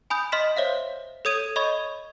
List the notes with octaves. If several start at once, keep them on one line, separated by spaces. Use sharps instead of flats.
G#5 B5 D#6 G6
D#5 C6 F6 B6 E7
C5 C#5 E5 F5
A4 C#5 D#6 G#6 D#7
C#5 D#5 B5 C#6 G#6